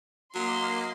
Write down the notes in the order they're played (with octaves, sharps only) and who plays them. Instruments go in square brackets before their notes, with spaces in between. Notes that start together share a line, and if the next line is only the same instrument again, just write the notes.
[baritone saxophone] F#3 [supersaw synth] A#3 D#5 [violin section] C6